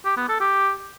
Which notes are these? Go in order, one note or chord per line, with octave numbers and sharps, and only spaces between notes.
G4
B3
A4
G4